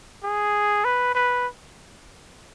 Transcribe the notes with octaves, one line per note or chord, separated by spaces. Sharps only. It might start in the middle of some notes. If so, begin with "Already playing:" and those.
G#4
B4
B4